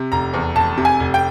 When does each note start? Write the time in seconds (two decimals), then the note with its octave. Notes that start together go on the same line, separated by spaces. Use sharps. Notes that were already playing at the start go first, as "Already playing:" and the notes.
Already playing: C3
0.12 F1 A#5
0.34 E2
0.55 F1 A5
0.77 C3
0.85 G#5
1.00 F1
1.14 G5